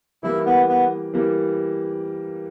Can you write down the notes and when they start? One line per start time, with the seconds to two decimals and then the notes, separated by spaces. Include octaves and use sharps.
0.23 E3 G3 A#3 E4
0.46 B3
0.69 B3
1.14 E3 G3 A#3